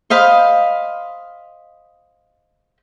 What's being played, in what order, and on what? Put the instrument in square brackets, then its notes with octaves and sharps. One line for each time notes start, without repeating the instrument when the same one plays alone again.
[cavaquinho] C5 D#5 F5 B5